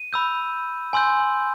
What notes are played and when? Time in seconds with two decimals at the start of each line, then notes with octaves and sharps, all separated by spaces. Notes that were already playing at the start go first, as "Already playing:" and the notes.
Already playing: D#7
0.13 B5 E6 G6
0.93 G#5 C6 E6 G6